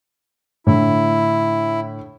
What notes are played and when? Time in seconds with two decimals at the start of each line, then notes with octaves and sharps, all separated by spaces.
0.67 A2 D3 E4